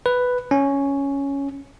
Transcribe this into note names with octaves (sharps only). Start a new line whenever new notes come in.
B4
C#4